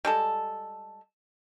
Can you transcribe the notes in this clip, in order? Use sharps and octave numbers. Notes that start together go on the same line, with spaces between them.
G3 G#3 A4